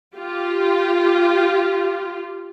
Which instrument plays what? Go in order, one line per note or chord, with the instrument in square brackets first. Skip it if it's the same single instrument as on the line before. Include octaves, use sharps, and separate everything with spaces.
[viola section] F4 G4